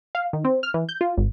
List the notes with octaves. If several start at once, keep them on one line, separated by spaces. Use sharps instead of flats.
F5
D#3
C4
F6
E3
G6
F4
G#1